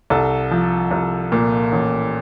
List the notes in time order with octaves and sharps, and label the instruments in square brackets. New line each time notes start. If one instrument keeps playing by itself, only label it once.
[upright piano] C2 A4
F3
C2
A#2
A1